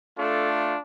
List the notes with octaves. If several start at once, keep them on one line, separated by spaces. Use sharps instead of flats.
A3 D4 F4 A4